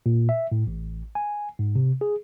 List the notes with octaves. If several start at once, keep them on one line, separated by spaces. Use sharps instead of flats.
A#2
E5
A2
A1
G#5
G#2
C3
G#4